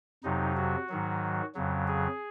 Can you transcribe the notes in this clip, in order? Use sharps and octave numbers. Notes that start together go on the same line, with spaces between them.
F2 C3 F#3 D#4
F#4
G#2 D#3 F#3
F2 C#3 F#3
G#4